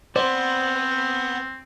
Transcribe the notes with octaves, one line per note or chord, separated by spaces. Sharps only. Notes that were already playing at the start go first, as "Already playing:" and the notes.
B3 C4 C5 D5